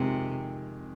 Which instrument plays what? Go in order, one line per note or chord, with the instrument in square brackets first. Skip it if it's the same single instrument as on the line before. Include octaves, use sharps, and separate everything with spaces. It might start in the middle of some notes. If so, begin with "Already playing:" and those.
Already playing: [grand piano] F2 D#3 G#3 [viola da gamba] C3